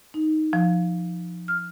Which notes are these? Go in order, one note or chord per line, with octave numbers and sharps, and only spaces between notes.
D#4
F3
F6